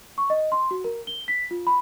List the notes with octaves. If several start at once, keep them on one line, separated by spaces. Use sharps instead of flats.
C#6
D#5
C6
F#4
A#4
G7
B6
F4
B5